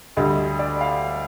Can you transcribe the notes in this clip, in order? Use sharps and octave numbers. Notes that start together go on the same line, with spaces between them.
D2 D3 G3 D#5
D5
F5